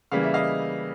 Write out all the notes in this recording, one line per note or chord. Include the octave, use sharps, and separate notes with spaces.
C#3 E3 G3 A#3 F5
E5
D#5 F5